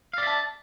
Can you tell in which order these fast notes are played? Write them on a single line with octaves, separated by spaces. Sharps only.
F5 D5 E5 A5